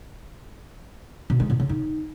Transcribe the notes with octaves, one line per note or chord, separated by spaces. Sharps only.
B2
G#3
A#2
C#3
D#4